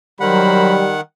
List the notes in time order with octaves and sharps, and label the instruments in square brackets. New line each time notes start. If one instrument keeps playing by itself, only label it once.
[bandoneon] D#3 F#5 [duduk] F#3 [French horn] G3 [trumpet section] A#4 C5 B5